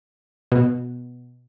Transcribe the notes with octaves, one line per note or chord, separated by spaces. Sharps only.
B2